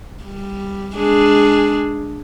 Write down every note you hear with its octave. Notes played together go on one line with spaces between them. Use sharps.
G3
G#3 D4 G#4